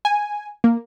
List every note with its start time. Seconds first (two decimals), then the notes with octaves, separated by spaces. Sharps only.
0.05 G#5
0.64 A#3